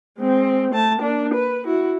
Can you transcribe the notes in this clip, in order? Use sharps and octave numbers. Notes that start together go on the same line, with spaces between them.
G#3 C4
A3 A5
A#3 D4
B4
E4 F#4